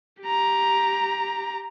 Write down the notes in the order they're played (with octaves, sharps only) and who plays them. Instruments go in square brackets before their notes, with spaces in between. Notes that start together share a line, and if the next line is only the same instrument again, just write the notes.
[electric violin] G4 A#5